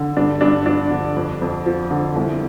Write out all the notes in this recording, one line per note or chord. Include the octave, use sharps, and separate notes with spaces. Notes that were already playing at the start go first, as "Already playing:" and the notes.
Already playing: D3
G2 D4
G2 D4
F3 D4
D3
F2
F2
F3
D3
C2